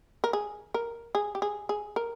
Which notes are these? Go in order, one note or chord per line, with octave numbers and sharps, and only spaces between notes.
A#4
G#4
A#4
G#4
G4
G#4
G#4
A#4